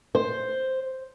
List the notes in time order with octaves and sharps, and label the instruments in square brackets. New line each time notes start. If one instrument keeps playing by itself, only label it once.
[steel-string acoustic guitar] C5